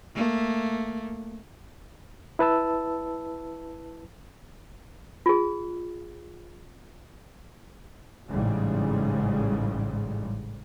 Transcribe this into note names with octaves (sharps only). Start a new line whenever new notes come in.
A3 A#3
E4 B4 A5 E6
F4 G#4
A1 G#2 C#3 G3